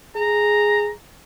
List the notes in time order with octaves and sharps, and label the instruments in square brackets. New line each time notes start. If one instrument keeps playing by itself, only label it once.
[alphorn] G#4 [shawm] A#5